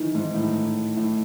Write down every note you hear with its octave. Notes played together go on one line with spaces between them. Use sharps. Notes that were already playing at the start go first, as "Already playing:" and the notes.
Already playing: D#3 E3
G#2
A2
A2